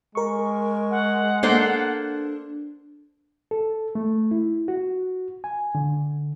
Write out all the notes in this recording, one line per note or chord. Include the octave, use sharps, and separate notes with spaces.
G#3 A#4 C#6
F#5
A#3 D4 A4 C5
A4
A3
E4
F#4
G#5
D3